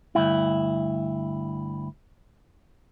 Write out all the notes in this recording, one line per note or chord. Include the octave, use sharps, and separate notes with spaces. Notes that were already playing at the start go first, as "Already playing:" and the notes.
D2 G2 E4